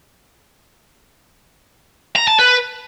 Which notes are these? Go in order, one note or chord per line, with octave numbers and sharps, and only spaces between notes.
A#5
A5
B4